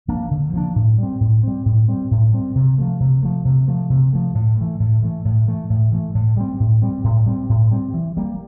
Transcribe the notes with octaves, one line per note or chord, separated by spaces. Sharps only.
F3 A#3 D4
D3
F3 A#3 D4
A2
G3 C4
A2
G3 C4
A2
G3 C4
A2
G3 C4
C3
F3 A3
C3
F3 A3
C3
F3 A3
C3
F3 A3
A2
E3 A3
A2
E3 A3
A2
E3 A3
A2
E3 A3
A2
G3 C4
A2
G3 C4
A2
G3 C4
A2
G3 C4
E3
G3 A#3